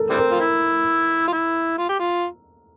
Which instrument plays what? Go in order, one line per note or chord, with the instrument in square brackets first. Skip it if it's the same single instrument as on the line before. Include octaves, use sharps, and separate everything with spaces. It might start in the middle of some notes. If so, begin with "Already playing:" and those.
Already playing: [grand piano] A4 A#4
[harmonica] E3 G3 C4
[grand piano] A#4
[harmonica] F4
E4
F4
E4
F4
G4
F4